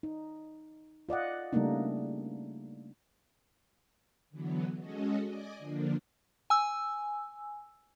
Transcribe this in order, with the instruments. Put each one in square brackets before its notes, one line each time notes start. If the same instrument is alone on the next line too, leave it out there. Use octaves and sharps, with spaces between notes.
[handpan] D#4
F4 D5 D#5 F#5
C#3 G3 A3 A#3 D4 D#4
[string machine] D3 E3 F#3 B3
G#3 C#4 F#4 A4 D#5
D5 D#5 G#5 D6
D3 F3 A#3 D4
[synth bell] G#5 E6